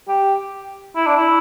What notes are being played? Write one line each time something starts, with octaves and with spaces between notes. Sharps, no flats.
G4
E4
D4
E4